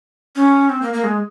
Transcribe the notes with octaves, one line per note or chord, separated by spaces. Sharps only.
C#4
C4
A#3
A#3
G#3